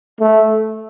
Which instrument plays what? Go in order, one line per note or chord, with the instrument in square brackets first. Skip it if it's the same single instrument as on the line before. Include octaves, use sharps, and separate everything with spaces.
[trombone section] A3